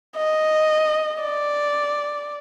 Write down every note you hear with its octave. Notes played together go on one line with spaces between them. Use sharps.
D#5
D5